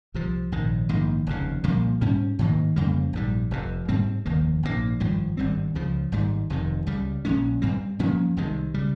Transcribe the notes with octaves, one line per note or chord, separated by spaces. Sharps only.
C2 C3 F3
A#1 G#2 D#3
A#1 G#2 D#3 A#3
F1 D#2 C#3
C2 A#2 F3 A#3
G#2 G3 C#4
G#2 D#3 A#3
F2 C#3 G3 A#3
A#1 G#2 D#3 G3
F1 F2 C3
G#2 G3 C4
F1 D#2 D#3 A#3
A#1 G#2 D#3 A#3
G#1 G2 F3
G#1 G2 G3 C4
C#2 C#3 F3
G#1 G#2 G3
F1 F2 C3 D#3
C#2 C#3 G3
A#1 A#2 G#3 C#4
G2 G3 C4
G2 F3 A#3 C#4
C2 C3 D#3 G#3
C#3 G3